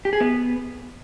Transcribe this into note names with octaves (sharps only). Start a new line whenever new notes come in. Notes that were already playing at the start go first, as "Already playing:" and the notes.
G4
G#4
B3